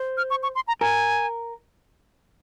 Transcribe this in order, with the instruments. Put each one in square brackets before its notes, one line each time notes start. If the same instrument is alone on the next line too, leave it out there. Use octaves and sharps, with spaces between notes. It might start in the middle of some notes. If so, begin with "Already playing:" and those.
Already playing: [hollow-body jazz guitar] C5
[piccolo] F6
C#6
C#6
C6
A#5
[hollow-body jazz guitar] A#4 [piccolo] G#5